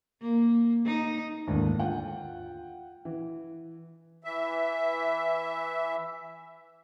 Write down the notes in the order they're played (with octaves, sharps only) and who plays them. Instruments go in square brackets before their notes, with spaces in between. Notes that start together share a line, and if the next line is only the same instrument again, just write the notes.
[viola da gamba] A#3
D#4
[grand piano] D#2 G#2 D3 E3
F4 F#5 G5
E3
[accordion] E3 E5